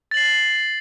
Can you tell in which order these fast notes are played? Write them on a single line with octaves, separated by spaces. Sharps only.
A6 F#7 C7